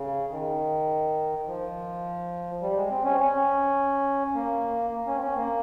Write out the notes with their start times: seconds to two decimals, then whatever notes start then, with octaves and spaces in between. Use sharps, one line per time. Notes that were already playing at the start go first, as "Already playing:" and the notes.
Already playing: C#3
0.31 D#3
1.47 F3
2.62 G3
2.76 G#3
2.90 C4
3.05 C#4
3.20 C#4
4.35 A#3
5.07 C#4
5.16 C4
5.21 C#4
5.36 A#3